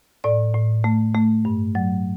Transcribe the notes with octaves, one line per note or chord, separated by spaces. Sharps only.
A2 D5
A2
A3
A3
G2
F#3